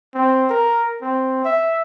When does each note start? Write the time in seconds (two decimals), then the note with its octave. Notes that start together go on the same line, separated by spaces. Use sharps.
0.15 C4
0.50 A#4
1.02 C4
1.45 E5